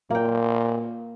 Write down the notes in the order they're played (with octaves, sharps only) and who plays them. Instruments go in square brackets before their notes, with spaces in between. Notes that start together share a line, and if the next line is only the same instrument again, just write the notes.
[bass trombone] A#2 [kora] A#3 G5